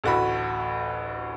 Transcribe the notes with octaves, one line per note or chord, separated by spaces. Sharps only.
A1 D2 F#4 A4 B5